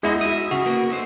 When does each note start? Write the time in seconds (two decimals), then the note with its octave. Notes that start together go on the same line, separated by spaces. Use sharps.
0.03 G#3 B3 D#4 E4 D#5
0.21 E4 F#4 E5 D#6
0.51 C#3 C#4 F#4
0.66 A#3 B3 A#4
0.90 A3 D#4 C5